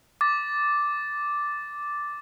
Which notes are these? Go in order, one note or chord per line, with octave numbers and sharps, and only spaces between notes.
D6 A6